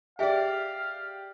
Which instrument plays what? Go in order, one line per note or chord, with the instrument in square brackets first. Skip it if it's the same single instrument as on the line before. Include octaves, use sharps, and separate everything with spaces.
[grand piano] G4 D5 [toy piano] G#4 E5 G#5 [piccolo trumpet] F5